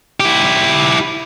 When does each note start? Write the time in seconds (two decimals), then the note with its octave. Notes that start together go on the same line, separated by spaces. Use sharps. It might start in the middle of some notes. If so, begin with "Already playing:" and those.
0.20 E4 G4